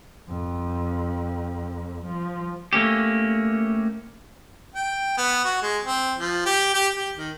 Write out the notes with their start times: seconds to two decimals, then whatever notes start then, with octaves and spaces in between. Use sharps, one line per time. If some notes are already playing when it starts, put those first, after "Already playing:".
0.28 F2
2.06 F3
2.73 A3 A#3 C#4 G4
4.76 G5
5.18 B3
5.45 F#4
5.63 G#3
5.85 C4
6.19 F3
6.46 G4
6.74 G4
6.96 G4
7.18 D#3